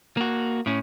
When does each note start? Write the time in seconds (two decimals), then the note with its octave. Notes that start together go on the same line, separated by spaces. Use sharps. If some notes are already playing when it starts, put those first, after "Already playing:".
0.17 A#3 F#4
0.66 A2 C#4